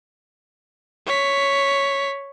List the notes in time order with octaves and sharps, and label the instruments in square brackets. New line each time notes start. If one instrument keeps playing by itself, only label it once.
[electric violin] C#5 B6